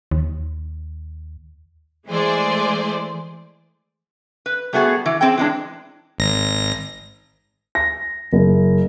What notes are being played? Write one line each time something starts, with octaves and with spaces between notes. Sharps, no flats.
D#2
E3 G#3 A3 G#4 C5 D5
B4
G3 A3 B3 F#4 G#4
E3
C4 G#4 G5
E3 G#3 D4
G#1 A#6
A#6
F#1